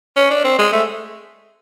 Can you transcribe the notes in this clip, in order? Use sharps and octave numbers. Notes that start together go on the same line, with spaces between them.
C#4
D4
C4
G#3
A3